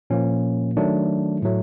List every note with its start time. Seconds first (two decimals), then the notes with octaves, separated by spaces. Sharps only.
0.10 A#2 F3 A#3 C#4
0.77 D#3 F#3 A3 D4
1.42 A2 F#3 A3